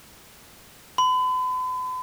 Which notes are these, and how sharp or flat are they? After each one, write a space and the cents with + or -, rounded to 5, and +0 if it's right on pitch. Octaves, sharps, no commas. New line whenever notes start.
B5 +45